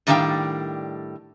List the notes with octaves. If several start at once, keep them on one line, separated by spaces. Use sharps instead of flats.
A2 D#3 G3 D4 F5 G5